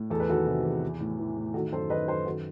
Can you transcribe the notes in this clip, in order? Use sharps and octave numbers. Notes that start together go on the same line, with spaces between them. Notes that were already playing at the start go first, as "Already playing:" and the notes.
Already playing: A2
E2 A4
B4
D#3 F#4 A4
C3
E2
E3
A2
E3
A2
D#3 F#4 A4
F#2 A4 C5
D#3 B4 D#5
F#2 A4 C5
D#3 F#4 A4